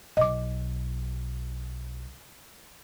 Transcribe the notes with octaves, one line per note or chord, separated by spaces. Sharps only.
B1 D#5 D6